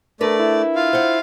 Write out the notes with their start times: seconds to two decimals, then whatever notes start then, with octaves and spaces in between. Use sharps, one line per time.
0.21 A3 D4 A#4 B4 D5
0.39 E4
0.75 F4 F5
0.93 C5 F#5